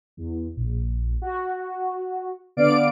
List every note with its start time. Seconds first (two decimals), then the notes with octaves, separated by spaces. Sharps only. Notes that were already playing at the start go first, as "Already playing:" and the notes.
0.17 E2
0.56 A#1
1.22 F#4
2.57 D3 B3 D5 F5 D7